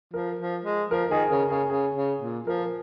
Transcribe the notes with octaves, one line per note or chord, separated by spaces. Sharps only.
F3 A#4
F3
G#3
F3 A#4
D#3 G#4
C#3 A#4
C#3 G#4
C#3 G#4
C#3
A#2
F3 A#4